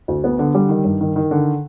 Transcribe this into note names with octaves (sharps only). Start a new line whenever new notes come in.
D2
B3
D3
G3
D#3
G2
D#3
D#3
D3